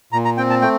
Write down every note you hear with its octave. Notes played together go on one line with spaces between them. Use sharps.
A#2 A#5
A#5
C4 G5
A5
A3 G5